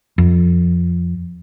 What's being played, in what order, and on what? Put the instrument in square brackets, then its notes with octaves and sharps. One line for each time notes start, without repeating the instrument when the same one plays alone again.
[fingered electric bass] F2